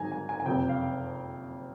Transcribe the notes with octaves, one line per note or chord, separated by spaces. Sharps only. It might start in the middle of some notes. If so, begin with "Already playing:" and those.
Already playing: G#2 D#3 F#3 G#5 A#5
G#5
G#5
G#5
F#1 F2 C3 G5
F5